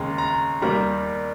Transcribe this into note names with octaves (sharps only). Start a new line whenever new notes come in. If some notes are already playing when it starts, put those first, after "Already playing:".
Already playing: D#2 C#3 G#3 A#5
A#5
D#2 D#3 G3 A#3 A#5